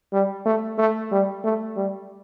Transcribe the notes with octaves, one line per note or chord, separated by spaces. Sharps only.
G3
A3
A3
G3
A3
G3